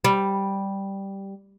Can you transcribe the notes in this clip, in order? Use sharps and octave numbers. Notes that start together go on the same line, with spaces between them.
G3